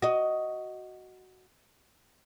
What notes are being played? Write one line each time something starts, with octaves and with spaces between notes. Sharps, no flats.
F#4 D#5